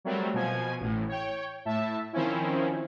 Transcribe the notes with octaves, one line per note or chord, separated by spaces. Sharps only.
F#3 G3 A3 C4 A#4
B2 F3 G#5
A1 A2
C#5 G5
A2 E5 A5
D#3 F3 C4 C#4 E4